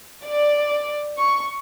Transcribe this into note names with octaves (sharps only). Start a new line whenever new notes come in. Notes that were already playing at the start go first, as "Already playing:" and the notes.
D5
C#6